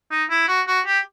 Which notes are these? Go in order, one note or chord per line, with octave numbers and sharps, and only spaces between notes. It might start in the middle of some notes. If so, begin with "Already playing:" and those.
D#4
E4
F#4
F#4
G4